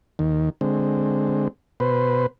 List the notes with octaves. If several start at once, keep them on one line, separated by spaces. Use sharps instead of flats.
D#2 D#3
D3 G#3 C4
B2 B4 C5